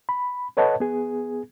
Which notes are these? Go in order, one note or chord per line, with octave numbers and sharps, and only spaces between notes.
B5
A4 B4 C#5 D#5 F#5 A5
B3 G#4